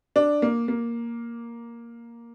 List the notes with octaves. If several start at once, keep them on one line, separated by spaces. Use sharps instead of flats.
D4
A#3
A#3